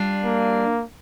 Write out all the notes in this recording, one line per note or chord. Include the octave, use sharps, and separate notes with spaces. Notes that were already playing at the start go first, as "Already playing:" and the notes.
Already playing: G3 D4 F4
A#3